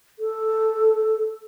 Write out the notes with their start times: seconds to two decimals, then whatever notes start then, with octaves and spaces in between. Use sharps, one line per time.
0.19 A4